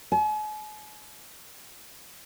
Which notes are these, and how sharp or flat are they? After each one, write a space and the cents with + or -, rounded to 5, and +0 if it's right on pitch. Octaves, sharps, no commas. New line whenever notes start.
G#5 +45